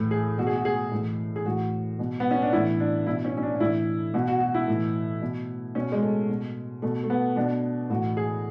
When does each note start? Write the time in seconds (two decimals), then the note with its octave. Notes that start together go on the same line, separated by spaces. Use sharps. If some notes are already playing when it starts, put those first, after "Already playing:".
Already playing: A2 E3
0.11 G#4
0.38 B2 F#4
0.47 G#4
0.56 F#4
0.65 G#4
0.91 A2 E3
1.36 G#4
1.45 A2 E3 F#4
1.99 B2
2.20 B3
2.31 C#4
2.42 D4
2.53 A2 E3 E4
2.80 D4
3.07 B2 E4
3.25 C#4
3.37 C#4
3.43 D4
3.55 D4
3.60 A2 E3 E4
4.14 B2 F#4
4.28 F#4
4.40 F#4
4.54 E4
4.68 A2 E3
5.21 B2
5.75 B2 C#4
5.92 G#3
6.02 A3
6.29 B2
6.82 B2 A3
7.04 A3
7.10 B3
7.36 B2 D4
7.90 A2 E3 F#4
8.17 G#4